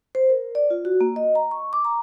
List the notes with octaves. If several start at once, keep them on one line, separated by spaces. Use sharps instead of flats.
C5
A#4
D5
F4
F#4
A#3
D#5
A#5
C#6
D6
A#5